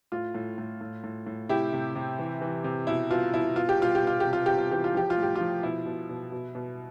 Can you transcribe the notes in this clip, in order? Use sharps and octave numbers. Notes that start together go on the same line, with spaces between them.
A2 F4
A2
A2
A2
A2
A2
C3 E4 G4
C3
C3
E3
E3
C3
B2 E4
B2 F4
B2 E4
B2 F4
G4
B2 F4
G4
B2 F4
C3 G4
F4
C3 G4
F4
E3 G4
F4
F3 G4
F4
A2
G4
F3 F4
B2 E4
B2
B2
B2
B2